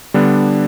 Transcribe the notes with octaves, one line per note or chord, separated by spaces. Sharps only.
D3 G3 B3 D4